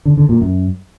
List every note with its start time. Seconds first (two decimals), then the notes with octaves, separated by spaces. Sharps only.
0.05 D3
0.17 D3
0.29 A#2
0.41 F#2